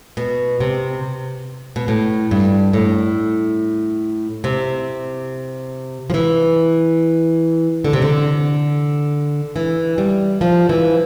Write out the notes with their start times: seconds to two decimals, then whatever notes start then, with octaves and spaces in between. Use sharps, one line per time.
0.17 B2
0.60 C3
1.76 B2
1.88 A2
2.31 G2
2.73 A2
4.44 C3
6.10 F3
6.14 E3
7.84 D3
7.93 C3
8.02 D3
9.56 E3
9.98 G3
10.41 F3
10.69 E3